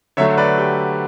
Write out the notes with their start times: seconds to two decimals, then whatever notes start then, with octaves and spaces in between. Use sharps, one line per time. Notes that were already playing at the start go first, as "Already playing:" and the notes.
0.17 D3 F#3 A3 C#5 E5
0.38 B4 D5
0.58 G4